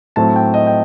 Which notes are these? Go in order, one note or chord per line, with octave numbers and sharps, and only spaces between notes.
A2 F#3 C4 A5
G5
D#5
G5